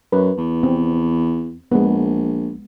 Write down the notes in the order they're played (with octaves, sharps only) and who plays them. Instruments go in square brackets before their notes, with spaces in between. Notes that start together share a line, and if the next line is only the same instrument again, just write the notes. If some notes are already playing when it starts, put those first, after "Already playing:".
[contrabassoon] F#2 [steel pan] B4
[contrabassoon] E2
[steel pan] C4
[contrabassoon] A#1 [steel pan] G#3 B3